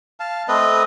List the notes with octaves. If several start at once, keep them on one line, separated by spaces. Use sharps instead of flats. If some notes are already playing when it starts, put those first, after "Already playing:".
F5 A5
A3 C4 B4 D#5